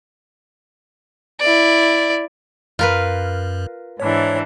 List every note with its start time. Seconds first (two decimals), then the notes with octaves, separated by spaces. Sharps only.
1.40 E4 D5
2.79 F#2 F4 A#4 B4
4.00 G#2 E3 D4 C#5